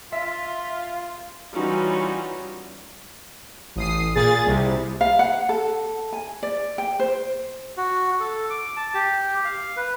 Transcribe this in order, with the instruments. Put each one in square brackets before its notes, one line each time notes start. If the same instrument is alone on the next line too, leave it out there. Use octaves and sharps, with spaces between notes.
[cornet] F4 [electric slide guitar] E5
[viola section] E3 G3 C#4 D#4 F4 F#4
[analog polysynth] A1 D#6 C7
A#2 G#4 A6
C2 C3
[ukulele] F5
F#5
A4
G#5
D5
G5
C5
[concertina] F#4
A4
D6
A5
G4
F5
B4